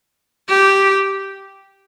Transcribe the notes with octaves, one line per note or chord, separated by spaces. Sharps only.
G4